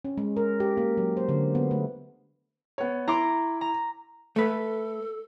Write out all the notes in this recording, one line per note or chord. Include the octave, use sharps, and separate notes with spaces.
C#4
G#3
A#4
G4
A#3
F#3
C5
D3
B3
A3
B3 C#5
E4 A#5 C6 D6
A#5
A3 A4 B4